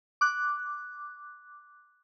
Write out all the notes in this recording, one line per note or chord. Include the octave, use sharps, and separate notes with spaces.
D6 F#6